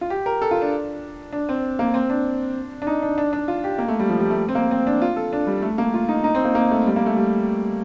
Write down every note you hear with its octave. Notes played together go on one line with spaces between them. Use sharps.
F4
G4
A#4
A4
F4
D4
D4
C4
A#3
C4
D4
D4
D#4
D4
D4
D4
F4
G4
A#3
A3
G3
F3
G3
A3
C4
A#3
C4
D4
F4
A4
D4
G3
A3
A#3
F4
D#4
D#4
C4
A#3
A#3
A3
G3
A#3
A3
G3